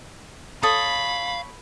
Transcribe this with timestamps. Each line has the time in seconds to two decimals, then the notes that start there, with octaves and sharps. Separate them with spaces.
0.63 A4 C#5 F5 B5 D#6